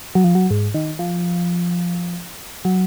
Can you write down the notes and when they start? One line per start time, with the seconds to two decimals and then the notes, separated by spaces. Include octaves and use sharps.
0.15 F#3
0.24 F3
0.35 F#3
0.51 G#2
0.74 D#3
0.99 F3
2.65 F#3